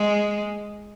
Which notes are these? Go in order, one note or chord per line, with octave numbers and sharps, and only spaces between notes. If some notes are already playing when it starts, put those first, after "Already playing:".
Already playing: G#3